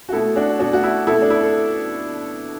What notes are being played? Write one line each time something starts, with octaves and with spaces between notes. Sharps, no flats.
F#4
B2 A3 E4 A4
D4 F#4
B2 A3 D4 F#4
F#4
E4
B2 A3 E4 A4
D4
E4
A4